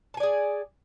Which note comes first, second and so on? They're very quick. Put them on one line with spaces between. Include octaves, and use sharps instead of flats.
A5 G#5 D5 G#4